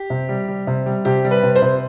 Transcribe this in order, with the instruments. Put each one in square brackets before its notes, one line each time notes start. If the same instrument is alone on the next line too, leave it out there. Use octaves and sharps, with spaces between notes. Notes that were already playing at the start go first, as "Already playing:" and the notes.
Already playing: [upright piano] G4
C3
G3
G3
C3
G3
C3 G4
G3
B4
C3
C5
C3